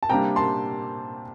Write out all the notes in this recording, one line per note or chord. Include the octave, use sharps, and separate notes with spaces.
A5
C3 G3 A#3 D4 G5 A#5
A5 C6